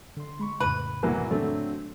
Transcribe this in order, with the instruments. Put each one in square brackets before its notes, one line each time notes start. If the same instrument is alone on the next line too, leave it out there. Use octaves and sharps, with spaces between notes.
[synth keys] D3 C6
G#3 B5 C#6
[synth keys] F2 A2 C#3 [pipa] B4
[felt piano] C2 [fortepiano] E3 F#3 A#3
[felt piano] D3 F#3 C4 [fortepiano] A3